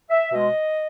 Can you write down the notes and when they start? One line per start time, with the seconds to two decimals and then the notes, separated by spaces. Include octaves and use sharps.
0.10 E5
0.32 B2 G#3 D#5